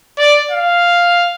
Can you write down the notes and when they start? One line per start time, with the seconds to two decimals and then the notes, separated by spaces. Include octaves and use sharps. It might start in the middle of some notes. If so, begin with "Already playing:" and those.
0.18 D5
0.51 F5